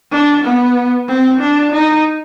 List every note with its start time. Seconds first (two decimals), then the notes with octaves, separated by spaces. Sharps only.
0.11 D4
0.44 B3
1.08 C4
1.40 D4
1.73 D#4